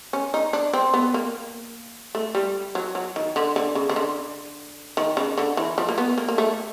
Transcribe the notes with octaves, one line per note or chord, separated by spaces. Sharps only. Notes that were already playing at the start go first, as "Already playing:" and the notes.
C#4
D#4
D4
C4
B3
A#3
A3
G3
F#3
F#3
D#3
D3
D3
C#3
C#3
D3
D#3
C#3
D3
E3
F3
A#3
B3
A#3
A#3
A3